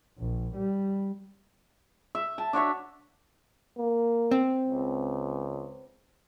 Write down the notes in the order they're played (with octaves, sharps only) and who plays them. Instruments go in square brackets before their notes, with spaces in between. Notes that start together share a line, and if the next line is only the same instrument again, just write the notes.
[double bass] A#1
G3
[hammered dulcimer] E5
A5
D4 F#4 C#5 E5
[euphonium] A#3
[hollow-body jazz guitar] C4
[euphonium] C#2